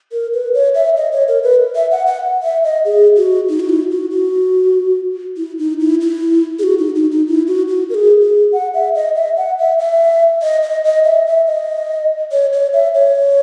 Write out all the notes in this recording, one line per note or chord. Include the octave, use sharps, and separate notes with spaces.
A#4
B4
C#5
E5
D#5
C#5
A#4
B4
E5
F#5
F#5
E5
D#5
G#4
F#4
D#4
F#4
E4
F#4
F#4
E4
D#4
E4
E4
G#4
F#4
D#4
D#4
D#4
E4
F#4
F#4
A#4
G#4
G#4
F#5
E5
D#5
E5
F#5
E5
E5
D#5
D#5
D#5
E5
E5
D#5
C#5
C#5
E5
C#5